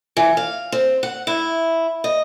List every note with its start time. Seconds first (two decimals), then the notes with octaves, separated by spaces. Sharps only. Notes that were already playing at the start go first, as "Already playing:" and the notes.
0.17 E3
0.37 F5
0.72 C4
1.03 F#5
1.27 E4
2.04 D#5